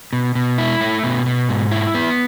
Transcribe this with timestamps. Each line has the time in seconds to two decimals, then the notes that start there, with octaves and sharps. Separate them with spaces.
0.13 B2
0.35 B2
0.58 E4
0.81 A3
1.04 B2
1.26 B2
1.49 G#2
1.71 E4
1.94 B3